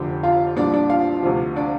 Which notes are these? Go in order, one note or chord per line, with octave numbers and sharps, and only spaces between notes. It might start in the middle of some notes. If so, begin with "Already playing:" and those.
Already playing: F1 F2 D3 G4
F4 F5
C2 A#2 F3 D4 D5
D4 D5
F4 F5
D2 C3 F3
D4 D5